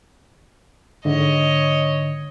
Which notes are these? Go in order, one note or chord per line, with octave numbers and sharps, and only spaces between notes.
G#2 D3 C#5 D#5